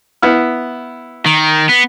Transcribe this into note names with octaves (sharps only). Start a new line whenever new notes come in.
B3 E4 F6
D#3
B3